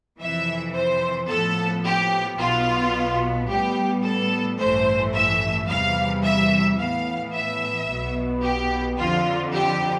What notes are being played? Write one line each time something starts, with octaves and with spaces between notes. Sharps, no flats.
F2 C3 E3 E5
C5
A2 F3 B3 A4
G4
B1 B2 B3 F4
A2 G3 B3 G4
A4
A1 G2 E3 A3 C5
E5
E2 C3 E3 G3 F5
E5
A2 E3 B3 F5
E5
B1 B2 B3
G4
F2 D3 F3 F4
G4